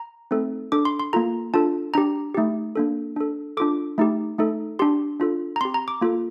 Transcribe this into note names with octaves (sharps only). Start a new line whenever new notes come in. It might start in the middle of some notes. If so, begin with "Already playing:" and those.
Already playing: A#5
A3 C4 D#4 A4
D4 A4 D6
C6
C6
A#3 F4 A4 A#5
D4 F4 A4 A5
D4 G4 A#5
A3 D#4 G4
A#3 D4 A4
D4 A4
D4 F4 A4 D6
A3 D#4 G4
A3 D#4 A4
D4 G4 C6
D4 F4 A4
A#5
C4 G4 C6
A#5
D6
A#3 F4 A4